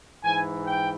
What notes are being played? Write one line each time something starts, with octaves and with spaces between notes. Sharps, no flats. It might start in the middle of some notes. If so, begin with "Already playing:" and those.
G#2 E3 G#5
G5